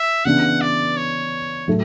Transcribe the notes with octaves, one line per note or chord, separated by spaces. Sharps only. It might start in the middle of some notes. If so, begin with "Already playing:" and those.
Already playing: E5
C#3 E3 B3 D4 F#5
D5
C#5
A2 F#3 A3